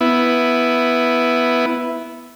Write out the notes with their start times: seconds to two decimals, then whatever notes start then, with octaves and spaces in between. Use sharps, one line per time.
0.01 B3 E4